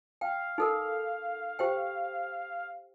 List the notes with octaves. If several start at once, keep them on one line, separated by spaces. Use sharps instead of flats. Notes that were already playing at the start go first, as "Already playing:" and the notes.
F5 G5
D#4 A4 A#4
G4 C5 G5